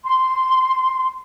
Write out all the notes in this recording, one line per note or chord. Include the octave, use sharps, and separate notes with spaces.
C6